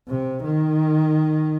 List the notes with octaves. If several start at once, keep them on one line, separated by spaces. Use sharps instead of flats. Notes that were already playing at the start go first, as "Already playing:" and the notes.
C3
D#3